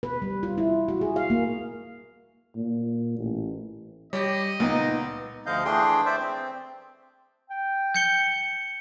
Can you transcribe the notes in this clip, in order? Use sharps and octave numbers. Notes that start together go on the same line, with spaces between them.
B4
G3
F4
E4
F#4
G#4
F5
A#3
A#2
A1
G3 G4 C#5 D#5
C#2 A#2 B3 D#4
D2 D3 F3 D#5 F5 G6
E3 A3 D4 G#4 G5 C6
C5 D5 E5
C4
G5
G6 C#7 G7